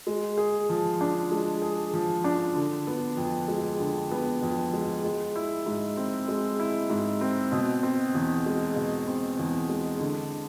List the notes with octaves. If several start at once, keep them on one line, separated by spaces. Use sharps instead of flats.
G#3
G#4
F3
D4
G#3
G#4
F3
D4
D3
B3
F2
G#3
D3
B3
F2
G#3
G#3
E4
G#2
C4
G#3
E4
G#2
C4
B2
C4
E2
G#3
B2
C4
E2
G#3
D3